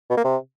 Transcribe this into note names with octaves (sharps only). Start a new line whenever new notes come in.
B2
A#3
C3